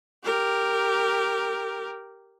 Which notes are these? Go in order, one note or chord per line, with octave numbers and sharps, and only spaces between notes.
G4 A#4